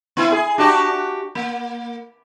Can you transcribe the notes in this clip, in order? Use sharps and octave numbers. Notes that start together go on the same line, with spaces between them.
B3 E4
G#4
D4 F#4 G4
A#3